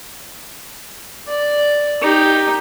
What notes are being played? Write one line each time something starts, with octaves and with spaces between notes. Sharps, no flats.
D5
D#4 G4